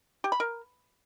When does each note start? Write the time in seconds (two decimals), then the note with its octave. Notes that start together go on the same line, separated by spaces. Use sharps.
0.24 G4
0.32 B5
0.40 A#4